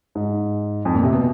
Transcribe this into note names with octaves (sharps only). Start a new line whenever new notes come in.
G#2
F2
A#2
C3
B2